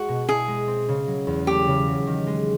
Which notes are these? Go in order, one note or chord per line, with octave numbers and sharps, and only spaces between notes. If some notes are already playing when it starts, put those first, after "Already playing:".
Already playing: G#3 F#4
B2
E4 G#4
G#3
C4
C#3
F#3
E2
A3 G4
C#3
F#3
D#3
G#3